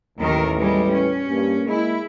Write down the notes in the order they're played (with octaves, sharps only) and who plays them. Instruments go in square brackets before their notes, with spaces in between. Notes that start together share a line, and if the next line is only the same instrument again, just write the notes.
[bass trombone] A1 [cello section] D#2 D#3 A#4
[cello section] G3 G#3 [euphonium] B4
[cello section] C#4
[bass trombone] G2 [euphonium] A#3
[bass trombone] G#3 [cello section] E4